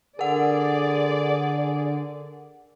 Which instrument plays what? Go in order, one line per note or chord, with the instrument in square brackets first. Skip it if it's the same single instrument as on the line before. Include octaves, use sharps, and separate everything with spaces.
[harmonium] D3 [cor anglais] G#4 [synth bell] A#4 F#5 [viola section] D5